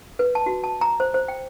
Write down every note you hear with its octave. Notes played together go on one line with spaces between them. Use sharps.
B4
A5
F#4
A5
A#5
C5
C5
G5